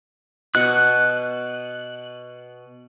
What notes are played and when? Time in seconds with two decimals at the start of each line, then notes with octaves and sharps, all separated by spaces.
0.55 B2 F#5 C#6 F#6